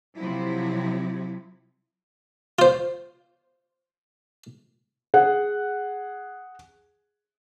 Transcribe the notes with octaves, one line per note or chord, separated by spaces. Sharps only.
C3 F3 F#3 E4
F4 C5
G#4 F#5